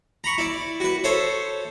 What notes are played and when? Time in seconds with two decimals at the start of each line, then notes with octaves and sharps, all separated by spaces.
0.24 A#5 B5 C#6
0.38 E4 D5
0.80 F#4 B4
1.04 A4 C5 C#5 E5